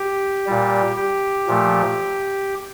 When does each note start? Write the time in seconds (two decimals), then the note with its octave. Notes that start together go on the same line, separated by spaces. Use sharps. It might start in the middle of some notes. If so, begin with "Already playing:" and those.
Already playing: G4
0.47 A#2 G3
0.97 G4
1.47 A#2 F3 A3